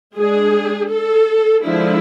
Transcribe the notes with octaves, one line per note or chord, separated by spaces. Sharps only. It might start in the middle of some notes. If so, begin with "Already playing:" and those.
G#3 D4 G#4
A4
D3 F3 G#3 D4 E4